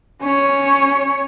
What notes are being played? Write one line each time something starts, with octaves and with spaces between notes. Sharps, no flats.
C#4 C#5